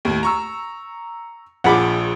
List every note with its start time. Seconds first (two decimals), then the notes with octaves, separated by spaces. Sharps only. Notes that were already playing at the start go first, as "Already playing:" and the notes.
0.05 D#2 A2
0.23 A#5 C#6 E6
1.64 A#1 F3 G#4 F#5 B5 D6